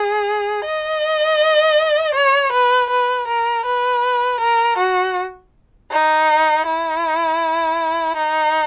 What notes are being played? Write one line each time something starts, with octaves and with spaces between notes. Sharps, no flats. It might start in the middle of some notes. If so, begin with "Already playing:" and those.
Already playing: G#4
D#5
C#5
B4
B4
A#4
B4
A#4
F#4
D#4
E4
D#4